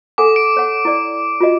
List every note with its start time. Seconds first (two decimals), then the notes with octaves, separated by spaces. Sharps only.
0.18 A4 F#5 G#5 D6
0.36 D7
0.57 C#5 F#5
0.85 E4 D5
1.40 F4 F#4 D#5